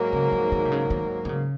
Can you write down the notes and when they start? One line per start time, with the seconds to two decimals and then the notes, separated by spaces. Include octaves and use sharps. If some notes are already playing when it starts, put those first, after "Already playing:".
Already playing: G#2 F#3 A#3
0.13 C#3
0.32 F3
0.52 D#3
0.65 C3
0.72 C#3
0.90 D#3
1.25 D#3
1.29 C#3